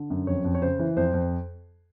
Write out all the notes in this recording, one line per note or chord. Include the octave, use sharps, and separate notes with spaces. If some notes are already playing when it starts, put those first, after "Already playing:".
Already playing: D3
F#2
F2 C#5
F2
C#5
C#3 C5
E3
F2 C5
F2